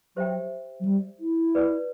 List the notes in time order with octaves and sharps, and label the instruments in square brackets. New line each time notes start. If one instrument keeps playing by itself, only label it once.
[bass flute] F#3 [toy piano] G4 C5 E5 G5
[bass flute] F#3
G3
E4
[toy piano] F#4 B4 D5